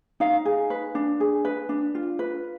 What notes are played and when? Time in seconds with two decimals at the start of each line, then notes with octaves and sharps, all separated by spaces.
0.20 D#4 F5
0.45 G#4
0.70 B4
0.95 D4
1.20 G#4
1.45 B4
1.69 D4
1.95 F4
2.19 B4